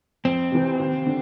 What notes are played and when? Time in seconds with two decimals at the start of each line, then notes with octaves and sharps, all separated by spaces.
0.25 F2 C4
0.51 C3 E3
0.80 D#2
1.06 D3